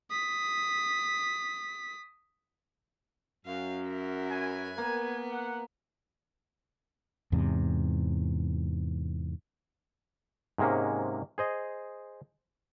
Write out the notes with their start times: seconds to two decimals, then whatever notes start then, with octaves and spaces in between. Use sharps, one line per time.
0.10 D#6 B6
3.46 F#2 F5
3.88 A#4 E5
4.30 B4 C#5 G#5
4.78 A#3 B3
5.29 F#5
7.32 E2 G#2 C3
10.58 G#2 C3 G#3 A#3 C#4
11.38 G#4 C5 D#5